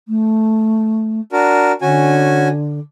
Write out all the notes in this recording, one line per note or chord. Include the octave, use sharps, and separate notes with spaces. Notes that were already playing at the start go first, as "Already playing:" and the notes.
A3
D4 F#4 A#4
D3 C#4 F#4 G#5